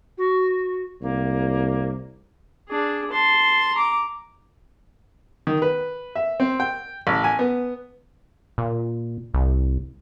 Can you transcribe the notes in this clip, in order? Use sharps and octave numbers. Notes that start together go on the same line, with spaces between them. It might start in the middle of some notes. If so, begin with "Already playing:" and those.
F#4
C2 A#3
D4 G#4
A5 C6
A#5 D6
D#3
B4
E5
C4
G5
A1
G#5
B3
A#2
C2